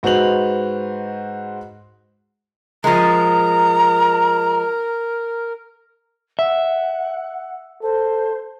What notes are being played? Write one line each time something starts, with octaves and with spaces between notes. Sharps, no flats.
G#2 F#4 B4 C5 F7 F#7
F3 G#3 A#4 A#5
E5 F#5
A4 C5